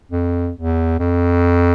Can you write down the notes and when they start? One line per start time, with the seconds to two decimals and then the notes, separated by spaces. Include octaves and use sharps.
0.11 F2
0.56 E2
0.99 F2